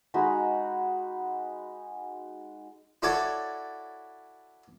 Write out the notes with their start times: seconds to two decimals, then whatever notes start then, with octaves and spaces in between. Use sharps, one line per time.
0.14 G#3 D#4 F#4 B5
3.02 E4 F#4 A4 C#5 D5